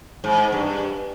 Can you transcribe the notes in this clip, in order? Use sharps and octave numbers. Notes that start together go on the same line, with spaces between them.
G#2
G2